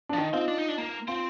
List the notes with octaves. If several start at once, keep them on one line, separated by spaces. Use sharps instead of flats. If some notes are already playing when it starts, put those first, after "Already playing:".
D4
F3
D#3 D#4
C4 F4
D4
D#4
D4
A#3
C4 F4